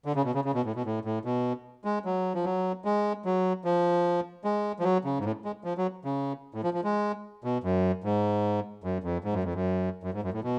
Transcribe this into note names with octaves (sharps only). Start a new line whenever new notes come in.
D3
C#3
B2
C#3
C#3
B2
A2
B2
A2
A2
B2
G#3
F#3
F3
F#3
G#3
F#3
F3
G#3
F3
F#3
C#3
G#2
A2
G#3
F3
F#3
C#3
A2
F3
F3
G#3
B2
F#2
G#2
F#2
F2
G#2
F#2
F2
F#2
F#2
G#2
F#2
A2
B2